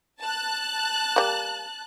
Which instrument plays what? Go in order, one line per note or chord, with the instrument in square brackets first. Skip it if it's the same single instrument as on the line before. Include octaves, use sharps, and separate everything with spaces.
[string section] A5 F#6
[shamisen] G3 A#3